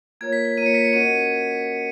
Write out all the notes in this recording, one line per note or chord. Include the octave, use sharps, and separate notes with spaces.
A#3 F4 A#4 C#5 G#6
B6
B6
A#3 F4 A#4 C#5 D#7
C#7
B6
C#7
C#4 F#4 A#4 D#5 F#5 D#7